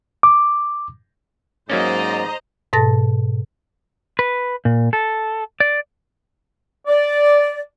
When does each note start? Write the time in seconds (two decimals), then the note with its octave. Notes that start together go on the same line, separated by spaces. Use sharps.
0.23 D6
1.70 G#2 F#3 A#3 C#4 C5 D5 D#5 A#5
2.73 G#2 B2 A4 A5 A6 A#6
4.19 B4
4.65 A#2
4.93 A4
5.60 D5
6.87 D5